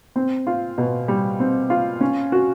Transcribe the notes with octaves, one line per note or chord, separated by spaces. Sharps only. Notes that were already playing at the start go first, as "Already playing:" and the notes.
C4
F4
B2
G3
C4
F4
C#4
F#4